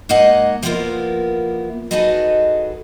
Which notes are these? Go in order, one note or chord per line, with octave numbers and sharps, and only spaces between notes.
G#2 A#3 D#4 D#5 F#5 G#5
F3 A#3 B3 E4 F4 A#4
D#4 F#4 G#4 A4 B4 D#5